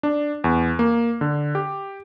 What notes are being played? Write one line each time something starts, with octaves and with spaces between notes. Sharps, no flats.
D4
E2
A#3
D3
G4